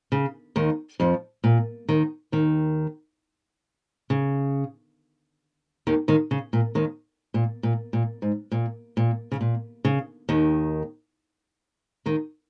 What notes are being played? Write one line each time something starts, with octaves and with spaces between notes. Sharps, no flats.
C#3
D#2 D#3
F2 F3
A#2
D#2 D#3
D#2 D#3
C#3
D#2 D#3
D#2 D#3
C#3
A#2
D#2 D#3
A#2
A#2
A#2
G#2
A#2
A#2
C#3
A#2
C#3
D#2 D#3
D#2 D#3